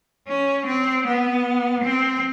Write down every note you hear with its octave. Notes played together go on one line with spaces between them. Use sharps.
C#4
C4
B3
C4